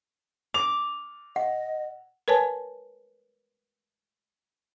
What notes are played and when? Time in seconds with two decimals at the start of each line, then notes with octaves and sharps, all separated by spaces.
0.54 D6 F7
1.36 D#5 F#5
2.28 A#4 B4 C#5 G#5 A5